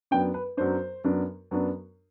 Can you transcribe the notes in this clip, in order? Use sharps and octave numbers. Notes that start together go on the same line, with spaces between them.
F#2 F#3 B3 D4 G5
B4
F#2 F#3 B3 D4 C5
F#2 F#3 B3 D4
F#2 F#3 B3 D4